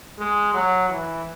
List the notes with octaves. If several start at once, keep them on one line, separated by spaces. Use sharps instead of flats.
G#3
F#3
E3